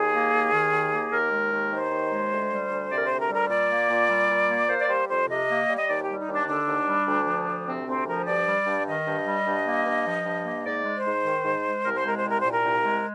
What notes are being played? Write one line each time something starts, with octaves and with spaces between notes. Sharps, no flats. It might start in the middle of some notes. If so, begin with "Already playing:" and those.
Already playing: D#2 G#4
A#3
D#2
D#3
D#2
A#3
D#2 A#4
G#3
D#2
D#3 C5
D#2
G#3
D2
G3
D2
C3 D5
A#4
C5
D2
A#4
G3 A#4
A#2 D5
A#3
A#2
G3
A#2
A#3
A#3 C5
D5
G3 C5
F2 C5
C3 D#5
A#3
G3
D#5
D#2 D5
G4
G3
D#4
D#2
D4
D3 D4
D#2
G3
D2
F3
D2
C3 C4
D2 C4
F3 A#4
G2 D5
G3
G2
D#3 D#5
G2
G3
G2
A#3
G2
F3
G2
A#3
G#2 D5
G#3
C5
G#2
D#3
G#2
G#3
C2 A#4
C5
G#3 A#4
C5
C2
A#4
A#2 C5
A#4
C2
G#3